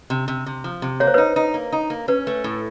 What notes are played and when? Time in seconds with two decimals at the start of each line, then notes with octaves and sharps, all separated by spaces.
0.10 C3
0.28 C3
0.46 C3
0.64 F3
0.82 C3
1.00 A#3 C#5
1.07 C5
1.14 D#4 B4 C#5
1.36 D#4
1.54 A#3
1.72 D#4
1.90 A#3
2.08 C#4 B4
2.27 A3
2.44 A2